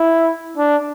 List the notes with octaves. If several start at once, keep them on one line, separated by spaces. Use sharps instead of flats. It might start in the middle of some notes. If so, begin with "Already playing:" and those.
Already playing: E4
D4